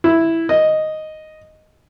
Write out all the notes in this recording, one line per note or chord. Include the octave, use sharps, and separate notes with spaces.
E4
D#5